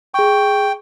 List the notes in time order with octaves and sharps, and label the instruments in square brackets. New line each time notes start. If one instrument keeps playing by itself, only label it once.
[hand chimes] G#4 C#6 [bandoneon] G5